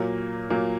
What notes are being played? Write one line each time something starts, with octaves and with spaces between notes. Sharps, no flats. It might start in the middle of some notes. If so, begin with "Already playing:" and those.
Already playing: A#2 F#3 A#3
A#2 F#3 A#3